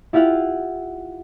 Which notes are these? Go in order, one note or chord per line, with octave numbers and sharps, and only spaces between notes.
E4 F4 G4 F5 F#5